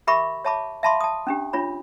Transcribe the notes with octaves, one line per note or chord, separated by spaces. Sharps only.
G4 A#4 E5 B5 C#6 D6
C#5 E5 A5 B5 D6
E5 F5 A5 B5 C6 D6
A5 D#6
C#4 D4 G4
D4 F4 C#5 B5